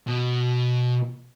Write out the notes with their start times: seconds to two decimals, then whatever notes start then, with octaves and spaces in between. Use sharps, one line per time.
0.07 B2